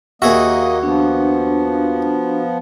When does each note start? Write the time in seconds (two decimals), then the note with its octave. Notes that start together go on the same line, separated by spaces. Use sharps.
0.22 D#2 A#3 F#4 G#4 D#5 E5
0.83 F3 B3 D4